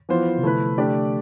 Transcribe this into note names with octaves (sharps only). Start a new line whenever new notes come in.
E3 F3 B3 F4 C5
C3
D3 A3 E4 B4
A3 D4 G4 D5